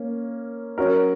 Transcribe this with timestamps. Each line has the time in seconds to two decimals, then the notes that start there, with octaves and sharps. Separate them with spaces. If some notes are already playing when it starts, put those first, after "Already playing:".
Already playing: A#3 C#4
0.78 F#3 C#4 F#4 A#4